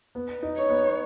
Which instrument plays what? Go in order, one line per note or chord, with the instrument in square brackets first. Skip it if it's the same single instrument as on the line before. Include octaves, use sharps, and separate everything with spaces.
[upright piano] B3
D#4
[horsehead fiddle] C#5
[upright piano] B3